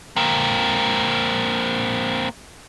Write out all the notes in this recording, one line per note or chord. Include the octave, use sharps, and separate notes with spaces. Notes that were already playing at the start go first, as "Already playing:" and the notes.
A#3 C4